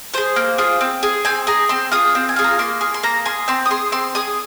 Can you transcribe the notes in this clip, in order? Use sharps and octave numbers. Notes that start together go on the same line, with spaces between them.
F4 G#4 C5
A#3
F4 G#4
C4
G#4
C4 G#5
G#4 A#5
C4 C6
F4 G#4 D#6
C4
G#5
F4 G#4
A#5
A#3 C6
G#4
C6
A#3 A#5
G#4 C6
C4 C6
D#6
G#4 C6
C4 C6
G#4 D#6